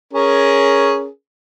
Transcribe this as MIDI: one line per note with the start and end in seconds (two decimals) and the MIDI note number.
0.13 1.07 61
0.13 1.07 68
0.13 1.07 70